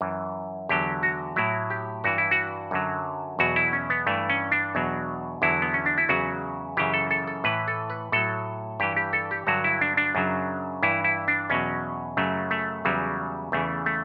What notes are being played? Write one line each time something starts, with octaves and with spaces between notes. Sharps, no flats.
F#2 E3
E2 D3 F#3 G4
F#4
A2 F#3 E4
G4
G2 E3 F#4
E4
F#4
F#2 D3 F#3
E2 B2 F#3 F#4
E4
C#4
B3
G2 E3 A3
C#4
D4
E2 B2 F#3
E2 D3 F#3 E4
B3
C#4
D4
E4
E2 C#3 F#3 F#4
F#2 C#3 E3 G4
A4
A4
A4
A2 E3 B4
A4
B4
A2 F#3 A4
G2 E3 G4
G4
A4
G4
G2 D3 F#3 F#4
E4
D4
D4
F#2 C#3 F#3
G2 E3 E4
E4
D4
E2 B2 F#3 C#4
F#2 C#3 F#3 A3
A3
E2 C#3 F#3 G3
E2 C#3 E3 A3
A3